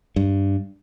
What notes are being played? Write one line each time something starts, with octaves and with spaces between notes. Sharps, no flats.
G2